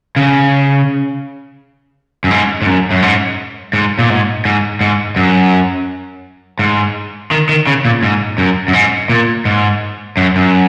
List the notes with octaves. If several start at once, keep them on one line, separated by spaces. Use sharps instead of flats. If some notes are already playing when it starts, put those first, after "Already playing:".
C#3
F#2
G#2
G#2
F#2
F#2
G#2
G#2
A#2
G#2
G#2
G#2
F#2
G#2
D#3
D#3
C#3
A#2
G#2
F#2
F#2
G#2
A#2
G#2
F#2
F#2